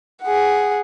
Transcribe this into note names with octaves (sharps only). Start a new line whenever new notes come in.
G#4 F#5